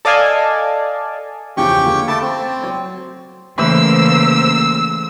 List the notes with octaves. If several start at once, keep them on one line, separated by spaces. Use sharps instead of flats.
A4 D5 D#5 F5 G#5 A5
E2 C#3 F3 G4 G5 C#6
D3 A#3 F4
A3 A5 B5 D6 A6
C4
F#3
C#3 E3 A3 A#3 B4 C5 E6